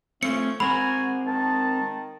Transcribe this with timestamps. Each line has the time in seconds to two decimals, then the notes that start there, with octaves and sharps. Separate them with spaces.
0.23 A3 C4 C#4 F4 C#7
0.60 G#3 C4 F#4 A#4 G#5 B5
1.27 D#3 A5